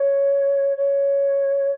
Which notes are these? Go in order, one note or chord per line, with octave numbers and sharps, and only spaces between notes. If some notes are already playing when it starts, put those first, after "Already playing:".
Already playing: C#5
C#5